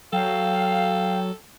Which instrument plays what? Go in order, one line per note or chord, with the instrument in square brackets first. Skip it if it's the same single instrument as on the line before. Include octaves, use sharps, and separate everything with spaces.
[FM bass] F#3 [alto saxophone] A4 [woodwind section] F5 [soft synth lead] G5